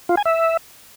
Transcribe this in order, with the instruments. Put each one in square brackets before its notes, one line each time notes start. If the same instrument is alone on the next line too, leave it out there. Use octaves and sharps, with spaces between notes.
[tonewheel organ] F4
G#5
E5